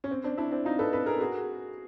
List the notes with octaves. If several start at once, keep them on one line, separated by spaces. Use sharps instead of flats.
C#4
C4
C4 D4
D4 E4
C4 D4
D#4 F4
A4 B4
A4 B4
G#4 A#4
F#4 G#4